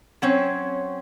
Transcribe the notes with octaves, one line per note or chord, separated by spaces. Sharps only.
F#3 C4 C#4